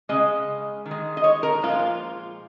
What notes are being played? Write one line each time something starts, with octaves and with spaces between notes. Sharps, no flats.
C#3 G#3 D#5
D#3
G#3
D#5
C#5
A#4
A#2 F3 G#3 F4